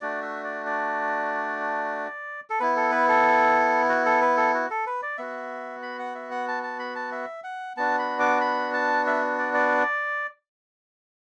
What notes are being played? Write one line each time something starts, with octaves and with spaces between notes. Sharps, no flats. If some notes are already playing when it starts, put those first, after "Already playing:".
A3 D4 F#4 D5
E5
D5
D5
A4
B3 E4 B4
A4
B4
A4
F#4
A4
B4
A4
F#4
A4
B4
D5
B3 F#4 E5
B5
F#5
E5
F#5
A5
A5
B5
A5
E5
F#5
B3 D4 F#4 A5
B5
D6
B5
A5
E5
D5
D5